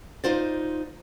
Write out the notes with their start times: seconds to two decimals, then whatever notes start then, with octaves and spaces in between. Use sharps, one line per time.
0.24 D#4 F4 C5 D5